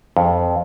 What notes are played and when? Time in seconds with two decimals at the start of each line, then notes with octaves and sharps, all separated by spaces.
0.17 F2